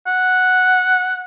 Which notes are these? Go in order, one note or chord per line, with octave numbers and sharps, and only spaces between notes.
F#5